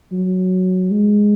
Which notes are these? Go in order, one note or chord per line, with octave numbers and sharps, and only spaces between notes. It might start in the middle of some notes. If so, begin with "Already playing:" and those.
F#3
G#3